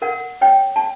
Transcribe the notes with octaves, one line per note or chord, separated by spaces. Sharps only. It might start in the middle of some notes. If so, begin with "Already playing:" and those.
A#4 F#5
C#5 G5
A5